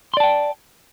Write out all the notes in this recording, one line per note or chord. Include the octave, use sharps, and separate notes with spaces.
D5 G5 A5 C6